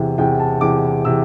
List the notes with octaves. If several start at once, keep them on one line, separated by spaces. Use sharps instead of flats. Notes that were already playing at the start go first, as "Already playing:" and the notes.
Already playing: E2 C3 E3
E2 C3 E3 G5
A5
E2 C3 E3 D6
C3 E3 E6